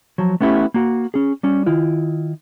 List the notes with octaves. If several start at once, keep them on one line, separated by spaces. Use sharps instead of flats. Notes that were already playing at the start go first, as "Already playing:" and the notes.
F3 F#3
A3 B3 C#4 E4 G4
A#3 F#4
C#4 G#4
G3 C#4
D#3 E4 F4